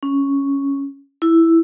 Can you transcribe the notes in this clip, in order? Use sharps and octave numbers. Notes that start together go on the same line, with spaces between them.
C#4
E4